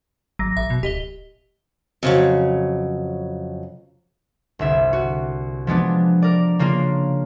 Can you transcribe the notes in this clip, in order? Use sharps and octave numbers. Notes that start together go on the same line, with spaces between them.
G#1 F#3 A#6
A1 E5
B2
D1 G4 D#5 G7
F2 C#3 F#3
G1 C2 E5
F#4
F3 G#3 B3 D4
A#4 D5
C#3 A#3 D4 F4